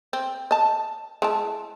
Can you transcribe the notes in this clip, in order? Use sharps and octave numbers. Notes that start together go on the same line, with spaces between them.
C4
D#5 A5
G#3 E4 A5